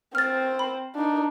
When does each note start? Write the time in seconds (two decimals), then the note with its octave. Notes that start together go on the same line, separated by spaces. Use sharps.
0.15 C4 C5 F6 A6
0.59 B5
0.95 D4 D#4